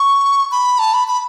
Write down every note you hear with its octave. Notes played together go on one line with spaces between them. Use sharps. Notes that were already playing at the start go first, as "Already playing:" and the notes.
Already playing: C#6
B5
A5
B5
B5